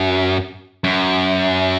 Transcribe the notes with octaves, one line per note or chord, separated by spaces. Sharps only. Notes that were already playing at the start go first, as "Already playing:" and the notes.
Already playing: F#2
F#2